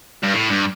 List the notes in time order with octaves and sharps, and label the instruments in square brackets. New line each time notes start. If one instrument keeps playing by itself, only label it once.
[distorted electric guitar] G2
A2
G2